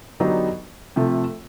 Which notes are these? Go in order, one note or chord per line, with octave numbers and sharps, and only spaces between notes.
D3 F#3 B3 D#4 G4
C3 F3 A3